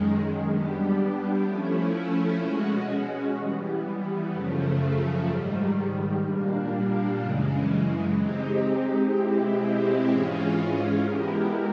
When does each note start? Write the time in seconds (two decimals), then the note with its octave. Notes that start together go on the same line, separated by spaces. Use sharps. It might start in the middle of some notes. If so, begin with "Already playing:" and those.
Already playing: F#2 D#3 G#3
0.47 G3 B3 D4 G4
1.43 F3 A3 C#4 E4
2.39 B2 G#3 C#4 F#4
3.35 E3 G3 B3
4.31 F#2 C#3 F3 A3
5.27 G#2 D#3 G3
6.23 A#2 G3 A#3 D4
7.20 F#2 C#3 E3 G#3
8.16 G#3 C4 D#4 G4
9.12 B2 G#3 C4 E4 G4
10.08 G#2 E3 G#3 C#4 F4
11.04 G#3 B3 E4 G4 A#4